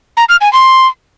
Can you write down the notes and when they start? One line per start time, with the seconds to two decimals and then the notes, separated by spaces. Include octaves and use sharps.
0.17 A#5
0.29 F6
0.41 G#5
0.53 C6